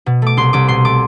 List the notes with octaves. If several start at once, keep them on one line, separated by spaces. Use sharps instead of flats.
B2
A3 D6
C2 C6
C2 D6
B2 C6
A3 D6